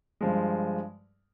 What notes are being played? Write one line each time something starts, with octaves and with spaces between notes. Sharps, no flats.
G2 F3 G#3